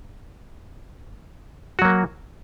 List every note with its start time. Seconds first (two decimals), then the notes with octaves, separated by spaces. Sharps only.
1.79 F#4
1.82 F#3
1.85 A#3